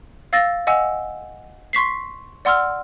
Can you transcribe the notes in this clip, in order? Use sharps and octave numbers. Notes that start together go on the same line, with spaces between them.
F5 E6 A6 A#6
D#5 F#5 G#5 E6
C6 C#6 B6 C7
D5 F#5 C6 E6 F6